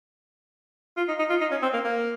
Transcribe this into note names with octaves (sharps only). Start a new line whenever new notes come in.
F4
D#4
D#4
F4
D#4
C#4
C4
A#3
A#3